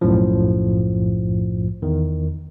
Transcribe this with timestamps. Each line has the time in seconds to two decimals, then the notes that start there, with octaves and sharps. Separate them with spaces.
0.01 B1 F#2 A2 F3
1.82 E2 D#3